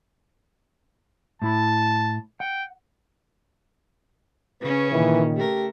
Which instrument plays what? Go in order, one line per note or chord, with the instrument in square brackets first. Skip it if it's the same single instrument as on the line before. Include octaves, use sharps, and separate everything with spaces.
[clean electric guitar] A2 E4 B5 [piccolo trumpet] A5
[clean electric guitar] F#5 [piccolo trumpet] G5
[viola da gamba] C#3 C#4 [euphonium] B4
[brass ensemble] A#2 D#3 [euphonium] E3
[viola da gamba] A3 A#4 [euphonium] G4